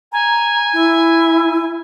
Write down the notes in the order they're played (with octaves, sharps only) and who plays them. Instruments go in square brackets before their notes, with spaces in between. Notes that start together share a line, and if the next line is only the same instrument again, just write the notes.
[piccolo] G#5 [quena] A#5
[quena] E4